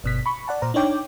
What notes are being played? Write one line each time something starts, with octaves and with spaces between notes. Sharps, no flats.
G1 B2 B6
B5 C#6
D5 F#5 A5
A#2 C5 A#5
D4 D#4 C#5 G5 D6